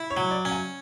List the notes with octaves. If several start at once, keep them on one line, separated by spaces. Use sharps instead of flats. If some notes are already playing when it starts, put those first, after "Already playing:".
Already playing: E4
C#5
F#3
D5
C#4
G#5